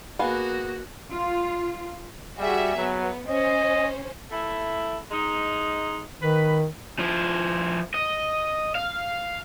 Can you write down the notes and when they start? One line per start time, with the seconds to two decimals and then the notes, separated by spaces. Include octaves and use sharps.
0.19 A#3 B3 F#4 G#4 F5
1.11 F4
2.39 G3 F#4 G#4 E5
2.77 F#3 B3
3.28 C#4 C5 D#5
4.30 A3 E4
5.11 G#3 D#4
6.22 D#3 B4
6.99 F3 E4
7.94 D#5
8.75 F5